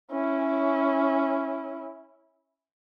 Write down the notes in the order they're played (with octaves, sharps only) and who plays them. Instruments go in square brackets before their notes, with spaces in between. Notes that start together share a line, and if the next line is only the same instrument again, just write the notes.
[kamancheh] C#4 E4